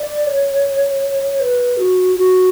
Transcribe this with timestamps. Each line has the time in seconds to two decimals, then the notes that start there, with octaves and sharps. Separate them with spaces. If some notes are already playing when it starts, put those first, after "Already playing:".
Already playing: D5
0.26 C#5
1.40 B4
1.77 F#4
2.15 F#4